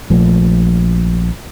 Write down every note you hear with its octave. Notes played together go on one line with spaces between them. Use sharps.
A#1 F3 A3